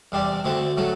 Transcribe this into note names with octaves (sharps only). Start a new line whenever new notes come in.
E2 C3 G3 D4
D2 D3 A3 C4
A2 F#3 A3